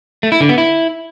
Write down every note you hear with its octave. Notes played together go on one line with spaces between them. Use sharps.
A3
E4
D3
B3
E4